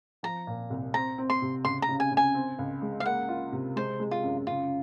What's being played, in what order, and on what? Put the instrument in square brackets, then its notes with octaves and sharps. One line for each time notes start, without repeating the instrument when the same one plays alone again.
[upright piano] F3 [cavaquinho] A#5
[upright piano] A#2
C2
[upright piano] C4 [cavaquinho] A#5
[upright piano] C4
[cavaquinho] C6
[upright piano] C3
[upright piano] C#2 [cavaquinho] C6
[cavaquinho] A#5
[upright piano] C#3
[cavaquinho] G#5
[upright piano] C#3
[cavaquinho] G#5
[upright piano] C4
C#2
G#3
[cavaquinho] F5
[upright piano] A#3 [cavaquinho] F#5
[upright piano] F4
C3
[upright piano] G#3 [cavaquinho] C5
[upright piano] G#3
[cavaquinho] F4
[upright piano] F#2
[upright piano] C#3 [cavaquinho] F4